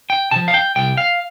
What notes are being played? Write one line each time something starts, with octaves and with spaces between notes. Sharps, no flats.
G5
C3 F3 A5
F5
G5
C2 G5
F5